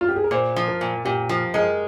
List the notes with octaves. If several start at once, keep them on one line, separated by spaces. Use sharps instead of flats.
F4
G4
G#4
A#4
A#2 C5
F3
A#4
A#2
A#2 G4
F3
G#3 A#4